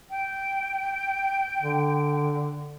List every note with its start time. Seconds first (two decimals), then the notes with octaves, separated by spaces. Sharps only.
0.10 G5
1.62 D3